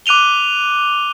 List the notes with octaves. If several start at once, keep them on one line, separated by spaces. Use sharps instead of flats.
D6 F#6 D#7 F7 G7